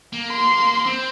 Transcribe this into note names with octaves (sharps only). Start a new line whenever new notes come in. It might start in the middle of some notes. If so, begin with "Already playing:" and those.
A#3
C6
C4